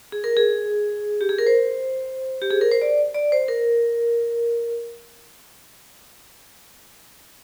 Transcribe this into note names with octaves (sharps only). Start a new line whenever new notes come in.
G#4
A#4
G#4
G4
G#4
A#4
C5
G4
G#4
A#4
C5
D5
D5
C5
A#4